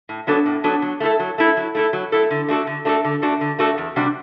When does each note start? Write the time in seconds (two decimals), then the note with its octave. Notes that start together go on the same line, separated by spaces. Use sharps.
0.09 A2
0.27 F#3 B3 D4 A4
0.46 A2
0.64 F#3 B3 D4 A4
0.82 F#3
1.00 A3 E4 A4
1.19 F#3
1.38 A3 E4 A4
1.57 F#3
1.75 A3 E4 A4
1.93 F#3
2.12 A3 E4 A4
2.30 D3
2.48 A3 D4 F#4 A4
2.67 D3
2.85 A3 D4 F#4 A4
3.05 D3
3.22 A3 D4 F#4 A4
3.41 D3
3.59 A3 D4 F#4 A4
3.78 E2
3.96 C3 G3 D4 F#4